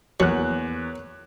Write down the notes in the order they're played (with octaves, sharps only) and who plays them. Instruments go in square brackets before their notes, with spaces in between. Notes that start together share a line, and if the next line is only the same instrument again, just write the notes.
[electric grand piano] E2 [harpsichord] F#3 [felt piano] A#3 C#5 F#6